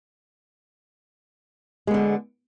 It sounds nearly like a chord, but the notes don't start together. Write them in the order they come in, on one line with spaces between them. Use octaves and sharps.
G#3 B3 D3